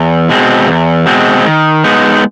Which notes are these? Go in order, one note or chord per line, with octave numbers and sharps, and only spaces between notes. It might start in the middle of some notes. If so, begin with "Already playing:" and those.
Already playing: E2
B2 G#3 C4
E2
B2 G#3 C4
D#3
G#3 B3 D#4